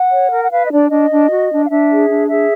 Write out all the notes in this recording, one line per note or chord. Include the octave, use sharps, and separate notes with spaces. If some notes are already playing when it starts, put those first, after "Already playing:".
Already playing: F#5
C#5
A#4
F#5
B4 F5
D#5
D4 D5
D4 D#5
D4
F#4
D4
F5
D4 E5
G#4
D4
G#4 E5